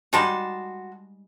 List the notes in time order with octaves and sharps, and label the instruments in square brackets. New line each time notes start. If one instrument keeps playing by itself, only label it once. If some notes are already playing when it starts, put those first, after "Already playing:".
[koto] G3 G#3 D#4 [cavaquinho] F#4 A5 C6